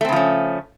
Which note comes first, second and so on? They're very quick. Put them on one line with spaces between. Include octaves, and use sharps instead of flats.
A3 C4 C#3 F3 C#4